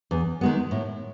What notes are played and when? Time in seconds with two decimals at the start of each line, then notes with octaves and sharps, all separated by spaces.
0.11 E2
0.41 D#3 G#3 B3
0.71 A2